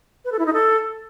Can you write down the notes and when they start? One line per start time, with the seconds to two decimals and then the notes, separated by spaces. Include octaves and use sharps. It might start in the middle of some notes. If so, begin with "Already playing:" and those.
0.25 B4
0.32 A4
0.39 E4
0.46 D#4
0.53 A4